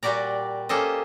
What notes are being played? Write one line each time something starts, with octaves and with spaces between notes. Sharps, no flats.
A#2 G3 F#4 G4 D5 A#5
A#3 C#4 G4 A4 C5 D#5